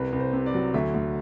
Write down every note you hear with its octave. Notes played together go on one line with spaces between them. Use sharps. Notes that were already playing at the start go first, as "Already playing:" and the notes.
Already playing: C2 B4
C2
C5
C3
D5
F#3
D2 E5
D2